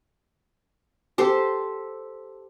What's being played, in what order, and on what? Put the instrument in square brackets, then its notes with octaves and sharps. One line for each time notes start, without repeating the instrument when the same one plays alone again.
[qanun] G4 A4 C5